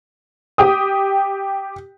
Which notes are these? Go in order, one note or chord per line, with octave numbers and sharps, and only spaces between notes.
G4 G5 D#6